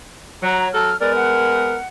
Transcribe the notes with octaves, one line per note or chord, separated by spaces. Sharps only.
F#3 A#5
F#3 A4 F6
G#3 B3 A#4 D5
F#5